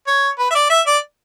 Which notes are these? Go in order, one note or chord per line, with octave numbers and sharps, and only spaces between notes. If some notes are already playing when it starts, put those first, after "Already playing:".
C#5
B4
E5
D5
E5
D5